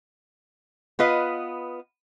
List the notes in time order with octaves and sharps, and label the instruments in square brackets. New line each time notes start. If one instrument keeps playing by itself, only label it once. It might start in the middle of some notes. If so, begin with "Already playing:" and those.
[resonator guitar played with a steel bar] B3 F4 B4 D#5